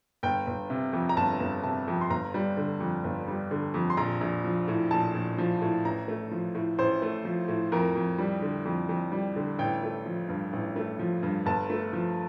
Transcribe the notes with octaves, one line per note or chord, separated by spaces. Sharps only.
G1 G5
G1
C3
F2
A#5
G1 A5
G1
C3 A5
F2
C6
G1 A#5
G3
D3
F2
G1
G3
D3
F2
C6
A#1 A#5
A#1
F3
A2
A#1 A5
A#1
F3
A2
A1 A#5
A3
F3
A2
A1 C5
A3
F3
A2
F2 A#4
F2
G3
D3
F2
F2
G3
D3
A1 G5
A3
F3
G2
A1
A3
F3
G2
G1 A5
A3
F3